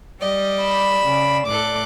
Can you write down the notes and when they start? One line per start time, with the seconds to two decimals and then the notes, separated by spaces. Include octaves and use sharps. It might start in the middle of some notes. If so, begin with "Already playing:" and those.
0.20 G3 G4 D5 D#5
0.61 B5 E7
1.02 C#3
1.47 A2 A4 D6 F#6